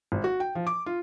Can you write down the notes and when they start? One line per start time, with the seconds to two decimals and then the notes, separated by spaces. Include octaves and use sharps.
0.12 G#1
0.24 F#4
0.40 G5
0.55 F3
0.67 D6
0.86 F4